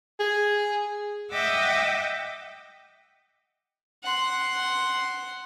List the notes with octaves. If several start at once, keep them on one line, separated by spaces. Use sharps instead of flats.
G#4
D#5 E5 F#5 G5 D6 E6
F#5 C6